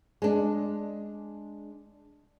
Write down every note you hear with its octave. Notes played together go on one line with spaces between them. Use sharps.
G#3 D4